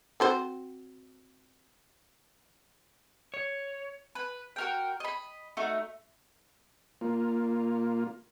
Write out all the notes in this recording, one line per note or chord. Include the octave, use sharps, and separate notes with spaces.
C4 F#4 C5
C#5
B4
F#4 A#4 G5
D#5 B5
A3 D#4 F#4
A#3 F4